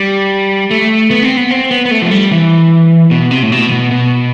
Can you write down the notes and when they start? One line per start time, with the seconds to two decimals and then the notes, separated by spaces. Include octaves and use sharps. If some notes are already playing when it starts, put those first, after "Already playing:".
Already playing: G3
0.71 A3
1.11 B3
1.23 C4
1.37 B3
1.51 C4
1.71 B3
1.85 B3
1.91 A3
2.02 F3
2.11 G3
2.31 E3
3.11 B2
3.31 C3
3.43 A2
3.52 B2
3.72 B2
3.91 B2